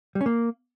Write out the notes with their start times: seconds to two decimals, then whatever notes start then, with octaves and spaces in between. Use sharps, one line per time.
0.15 G3
0.21 C#4
0.26 A#3